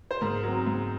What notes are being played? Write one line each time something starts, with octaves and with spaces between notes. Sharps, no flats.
C5
G#2 A#4
F#3 C4
G#2